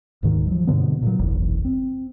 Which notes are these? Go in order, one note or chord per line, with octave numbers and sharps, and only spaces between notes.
D1 G#2 D#3
F3 F#3
G2 B2 D3 B3
A#2 F#3
F#1 B1 E2
C4